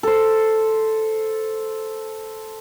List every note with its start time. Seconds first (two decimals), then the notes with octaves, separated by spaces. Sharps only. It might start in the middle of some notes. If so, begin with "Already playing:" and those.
0.03 A4 C5